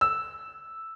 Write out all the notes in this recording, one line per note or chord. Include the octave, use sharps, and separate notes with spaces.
E6